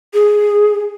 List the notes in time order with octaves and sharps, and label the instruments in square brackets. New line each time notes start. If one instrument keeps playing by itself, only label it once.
[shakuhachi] G#4